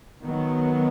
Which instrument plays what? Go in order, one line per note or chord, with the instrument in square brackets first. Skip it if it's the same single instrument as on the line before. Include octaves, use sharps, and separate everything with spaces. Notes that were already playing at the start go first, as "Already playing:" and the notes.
[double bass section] D#3 F#3 B3